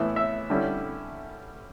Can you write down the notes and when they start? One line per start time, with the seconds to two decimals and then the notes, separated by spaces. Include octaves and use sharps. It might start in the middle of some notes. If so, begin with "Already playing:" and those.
Already playing: A2 E3 B3 E4
0.16 E5
0.50 D3 G3 C#4 E4